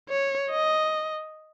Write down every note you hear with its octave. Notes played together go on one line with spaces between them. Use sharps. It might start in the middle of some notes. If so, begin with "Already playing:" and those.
C#5
D#5